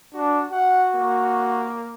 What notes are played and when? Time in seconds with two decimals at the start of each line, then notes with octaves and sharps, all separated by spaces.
0.14 D4 F#4
0.52 F#4 F#5
0.95 A#3